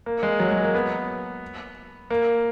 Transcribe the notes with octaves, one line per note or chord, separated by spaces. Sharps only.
A#3
G#3
F#3
G#3
A#3
B3
A#3